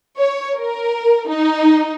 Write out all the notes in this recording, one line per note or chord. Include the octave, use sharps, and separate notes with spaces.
C#5
A#4
D#4